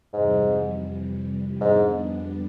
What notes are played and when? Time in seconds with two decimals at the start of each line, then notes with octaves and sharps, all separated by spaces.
0.13 F2 G#2 C3 E3 G3
1.61 F2 G#2 D3 G3 B3 D4